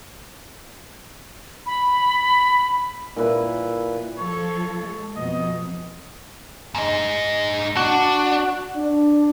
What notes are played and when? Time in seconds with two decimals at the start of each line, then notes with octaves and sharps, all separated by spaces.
1.66 B5
3.16 A#2 E4 B4 E5
4.17 F3 A4 C#5
4.83 G#3
5.16 F2 B2 D#5
6.75 G#2 D#5
7.77 D4 F#4
8.75 D4